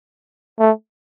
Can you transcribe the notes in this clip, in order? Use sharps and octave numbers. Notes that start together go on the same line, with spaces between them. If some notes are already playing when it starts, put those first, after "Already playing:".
A3